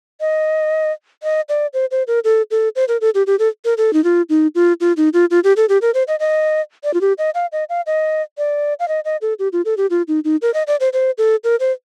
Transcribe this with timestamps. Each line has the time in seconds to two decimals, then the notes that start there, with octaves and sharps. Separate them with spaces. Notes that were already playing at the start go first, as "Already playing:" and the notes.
0.21 D#5
1.23 D#5
1.49 D5
1.74 C5
1.91 C5
2.07 A#4
2.24 A4
2.51 A4
2.76 C5
2.88 A#4
3.01 A4
3.15 G4
3.27 G4
3.39 A4
3.65 A#4
3.77 A4
3.93 D#4
4.04 F4
4.29 D#4
4.55 F4
4.81 F4
4.97 D#4
5.13 F4
5.31 F4
5.44 G4
5.57 A4
5.69 G4
5.82 A#4
5.94 C5
6.08 D#5
6.20 D#5
6.84 D5
6.94 F4
7.01 G4
7.18 D#5
7.35 F5
7.52 D#5
7.69 F5
7.86 D#5
8.38 D5
8.80 F5
8.88 D#5
9.05 D#5
9.22 A4
9.39 G4
9.53 F4
9.65 A4
9.77 G4
9.90 F4
10.08 D#4
10.24 D#4
10.42 A#4
10.54 D#5
10.67 D5
10.80 C5
10.93 C5
11.18 A4
11.44 A#4
11.60 C5